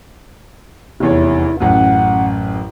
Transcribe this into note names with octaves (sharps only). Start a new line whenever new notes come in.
F1 E2 E4 C#5
A1 F#2 F#5